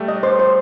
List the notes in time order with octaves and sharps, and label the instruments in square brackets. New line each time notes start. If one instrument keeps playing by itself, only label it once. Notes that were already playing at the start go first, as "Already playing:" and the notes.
Already playing: [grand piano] G3 A3
[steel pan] D#5
C5
C5